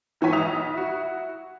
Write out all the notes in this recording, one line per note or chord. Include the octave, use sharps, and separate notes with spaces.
G#1 E3 C#5 G#5 B6
B1 D#6 F7
E4 F#4